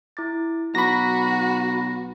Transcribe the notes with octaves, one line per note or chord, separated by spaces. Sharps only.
E4 D6 A6
B1 F#4 A#5 B5 C#6 D6 A#6